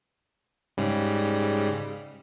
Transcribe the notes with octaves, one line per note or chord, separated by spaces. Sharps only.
G#2 C#3 G3